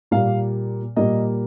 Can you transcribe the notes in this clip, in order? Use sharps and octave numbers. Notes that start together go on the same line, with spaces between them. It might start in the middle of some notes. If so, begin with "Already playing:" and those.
A#2 G3 A#3 F5
A#2 G3 A#3 D#5